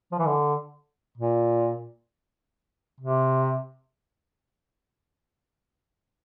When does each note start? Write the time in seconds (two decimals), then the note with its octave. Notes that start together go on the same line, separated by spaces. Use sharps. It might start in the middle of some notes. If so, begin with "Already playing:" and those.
0.12 F3
0.19 E3
0.27 D3
1.18 A#2
3.01 C3